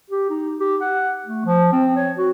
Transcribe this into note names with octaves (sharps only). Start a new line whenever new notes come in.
G4
D#4
G4
F#5
A3
F3
C4
C#5
F#4